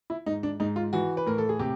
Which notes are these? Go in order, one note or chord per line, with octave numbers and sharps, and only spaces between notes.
E4
G#2 D#4
D4
G#2 D#4
F4
E3 F#4
B4
A2 A#4
A4
G#4
C3 G4